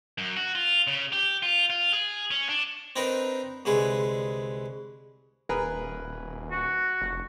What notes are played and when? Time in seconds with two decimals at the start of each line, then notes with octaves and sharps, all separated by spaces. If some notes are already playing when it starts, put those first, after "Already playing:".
0.18 F#2
0.37 F#4
0.55 F4
0.87 C#3
1.13 G4
1.43 F4
1.70 F4
1.93 G#4
2.31 C#4
2.49 D4
2.96 C4 D4 D#4 A#4 B4
3.65 C2 D3 G#3 G#4 B4
5.49 D#1 G#4 A#4 B4
6.52 F#4
7.01 F1